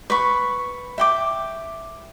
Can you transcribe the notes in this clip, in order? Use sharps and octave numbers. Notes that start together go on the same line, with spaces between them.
B4 B5 C#6
E5 G5 D6